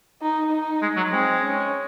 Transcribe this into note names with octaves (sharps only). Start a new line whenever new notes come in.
D#4
D#4
G#3
F#3
G#3 C4
C#4